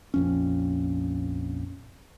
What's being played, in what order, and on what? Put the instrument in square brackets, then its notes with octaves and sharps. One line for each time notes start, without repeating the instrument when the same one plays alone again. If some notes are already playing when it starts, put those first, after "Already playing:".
[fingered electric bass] A#1 F2 C#4